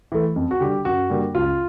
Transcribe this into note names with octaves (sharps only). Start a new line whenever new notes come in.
E3 A3
F2
F#4
D3 G3 G4
F#2 F#4
D3 G3 A#3
C#2 F4